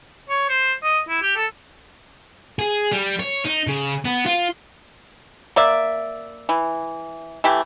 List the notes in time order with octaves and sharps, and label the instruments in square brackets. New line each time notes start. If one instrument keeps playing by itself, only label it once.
[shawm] C#5
C5
D#5
E4
G4
A4
[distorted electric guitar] G#4
G3
C#5
D#4
C#3
B3
F4
[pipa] A#3 D5 E5
E3
E3 A3 G4